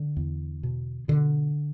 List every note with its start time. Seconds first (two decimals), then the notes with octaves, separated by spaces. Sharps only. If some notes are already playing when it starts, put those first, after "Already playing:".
Already playing: D3
0.17 E2
0.63 B2
1.08 B2 D3